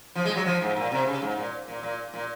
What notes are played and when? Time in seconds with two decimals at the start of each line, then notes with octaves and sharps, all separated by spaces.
0.15 F3
0.25 G#3
0.36 F#3
0.46 F3
0.61 G#2
0.77 A#2
0.92 C3
1.07 C#3
1.22 G#2
1.37 A#2
1.68 A#2
1.83 A#2
2.14 A#2